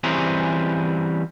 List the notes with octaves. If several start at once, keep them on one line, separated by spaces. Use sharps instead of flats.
E3 G3 C4 C#4 G#4 A#4